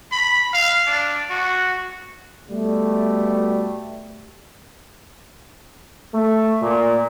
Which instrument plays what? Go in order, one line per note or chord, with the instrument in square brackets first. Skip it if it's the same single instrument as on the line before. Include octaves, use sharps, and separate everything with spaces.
[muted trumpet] B5
F5
D4
F#4
[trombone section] B2 G3 A3
[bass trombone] A3
A#2